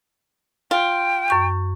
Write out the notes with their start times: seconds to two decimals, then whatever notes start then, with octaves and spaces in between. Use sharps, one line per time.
0.71 F4 G5
1.28 F#2 C#6 G6